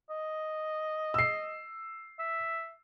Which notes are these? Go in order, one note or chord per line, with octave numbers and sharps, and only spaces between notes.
D#5
E6 C7
E5